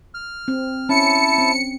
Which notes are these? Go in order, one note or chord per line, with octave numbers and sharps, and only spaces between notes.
F6
C4
C#4 E4 A5 C#7
C4